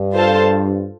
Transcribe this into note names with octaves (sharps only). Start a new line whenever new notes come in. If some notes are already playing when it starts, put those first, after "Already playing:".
Already playing: G2
F4 A4 C5 F5 A5